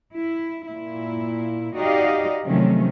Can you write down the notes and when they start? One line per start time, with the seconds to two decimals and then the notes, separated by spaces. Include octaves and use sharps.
0.14 E4
0.68 A#2 E4
1.75 D#4 F#4 G4 D5 D#5 F5
2.45 C3 D#3 F3 F#3 A3 C#4